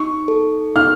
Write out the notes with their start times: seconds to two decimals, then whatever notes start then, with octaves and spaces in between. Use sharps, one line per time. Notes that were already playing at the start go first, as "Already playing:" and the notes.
Already playing: D#4 C#6
0.28 A4
0.76 D#4 F6